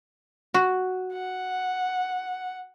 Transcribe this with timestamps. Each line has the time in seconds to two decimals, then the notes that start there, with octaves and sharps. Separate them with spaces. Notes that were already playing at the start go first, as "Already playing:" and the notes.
0.54 F#4
1.13 F#5